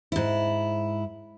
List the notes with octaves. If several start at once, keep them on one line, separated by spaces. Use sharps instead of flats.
G#2 E4